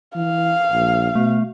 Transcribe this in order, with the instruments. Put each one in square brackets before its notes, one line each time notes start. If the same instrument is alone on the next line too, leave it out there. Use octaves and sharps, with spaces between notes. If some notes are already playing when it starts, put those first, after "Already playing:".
[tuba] E3 [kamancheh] F5
[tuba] A#1
[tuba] B2 [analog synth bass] A3